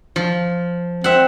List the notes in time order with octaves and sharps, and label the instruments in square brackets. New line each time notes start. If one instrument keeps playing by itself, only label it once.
[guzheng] F3
[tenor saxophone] C4 [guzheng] E5 F#5